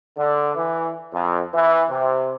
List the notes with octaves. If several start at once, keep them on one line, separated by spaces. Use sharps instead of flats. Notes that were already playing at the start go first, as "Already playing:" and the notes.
D3
E3
F2
E3
C3